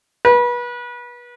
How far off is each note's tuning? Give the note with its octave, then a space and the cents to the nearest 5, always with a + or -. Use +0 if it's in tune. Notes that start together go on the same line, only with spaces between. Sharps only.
B4 -30